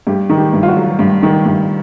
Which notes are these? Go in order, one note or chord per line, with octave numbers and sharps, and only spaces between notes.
G2 G4
D#3
G4
G2
F4
F#4
F#3
G2
D#3
G2